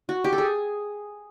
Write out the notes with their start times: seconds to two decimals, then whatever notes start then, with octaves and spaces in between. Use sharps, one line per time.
0.09 F#4
0.24 G4
0.33 A4
0.38 G#4